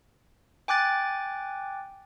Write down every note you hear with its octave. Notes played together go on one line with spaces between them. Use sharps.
G5 G#5 D6 F#6 A6